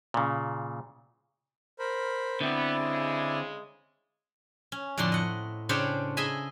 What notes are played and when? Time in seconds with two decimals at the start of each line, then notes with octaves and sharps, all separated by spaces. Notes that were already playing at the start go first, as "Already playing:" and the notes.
0.14 A#2 C#3
1.79 A#4 C5 B5
2.41 D3 B3 C4 E4 D5
2.78 C#3 G#3
4.72 C#4
4.98 F2 A2 D3 D4 C6
5.12 D#5 F#5
5.69 C#3 D4 C5 C#5 G5 B5
6.17 G#4 D#5 E5 G#5 B5